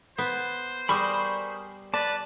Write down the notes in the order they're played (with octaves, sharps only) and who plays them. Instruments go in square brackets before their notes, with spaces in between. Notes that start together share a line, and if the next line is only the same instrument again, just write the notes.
[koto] B3 [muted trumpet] C5
[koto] G3 [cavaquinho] G#4 A#4 D5 [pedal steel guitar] B5 C#6 D#6
[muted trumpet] B4 [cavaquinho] D5 [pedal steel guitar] A5